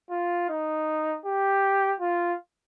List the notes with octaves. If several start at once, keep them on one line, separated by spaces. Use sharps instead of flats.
F4
D#4
G4
F4